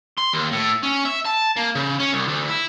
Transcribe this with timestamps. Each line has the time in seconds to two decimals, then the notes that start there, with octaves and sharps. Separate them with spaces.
0.18 C6
0.34 D#2
0.52 A2
0.83 C#4
1.05 E5
1.25 A5
1.56 A#3
1.75 C#3
2.00 C#4
2.13 C2
2.28 D2
2.49 E4